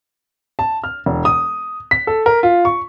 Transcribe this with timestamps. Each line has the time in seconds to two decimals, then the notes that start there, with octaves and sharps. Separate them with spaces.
0.59 A5
0.84 F6
1.06 E1
1.25 D#6
1.91 B6
2.07 A4
2.26 A#4
2.43 F4
2.65 C#6